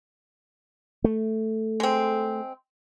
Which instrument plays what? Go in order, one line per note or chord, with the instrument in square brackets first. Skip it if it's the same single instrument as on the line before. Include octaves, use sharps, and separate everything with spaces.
[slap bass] A3
[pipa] G#3 C4